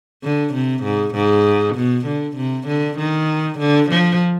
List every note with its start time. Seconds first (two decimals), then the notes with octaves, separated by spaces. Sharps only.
0.23 D3
0.54 C3
0.84 G#2
1.15 G#2
1.76 B2
2.07 D3
2.37 C3
2.68 D3
2.98 D#3
3.59 D3
3.91 F3